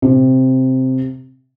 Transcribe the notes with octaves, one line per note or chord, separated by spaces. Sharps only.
C3